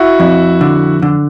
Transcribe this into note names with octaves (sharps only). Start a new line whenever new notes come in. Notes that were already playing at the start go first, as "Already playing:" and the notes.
Already playing: E4 F#4
F2
D3
D3